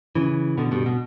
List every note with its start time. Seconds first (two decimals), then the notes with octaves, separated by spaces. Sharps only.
0.15 C#3 E3
0.58 B2 D3
0.71 G2 B2
0.86 B2